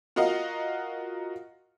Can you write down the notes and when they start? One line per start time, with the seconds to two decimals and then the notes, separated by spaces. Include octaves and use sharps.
0.16 F4 F#4 A#4 D#5 F5 F#5